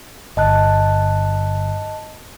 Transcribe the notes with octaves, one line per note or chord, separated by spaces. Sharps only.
G1 D#5 A5 F#6